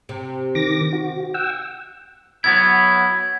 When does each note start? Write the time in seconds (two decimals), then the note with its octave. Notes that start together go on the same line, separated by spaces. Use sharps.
0.09 C3
0.55 D#3 D6 A#6
0.93 F#4
1.34 F#5 G5 E6
2.44 F#3 B3 E4 G#6